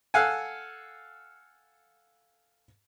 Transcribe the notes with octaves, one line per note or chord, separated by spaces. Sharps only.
A4 F5 F#5 G#5